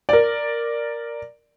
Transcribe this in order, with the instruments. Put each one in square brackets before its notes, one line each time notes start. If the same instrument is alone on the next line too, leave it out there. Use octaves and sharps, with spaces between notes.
[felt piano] A#4 D5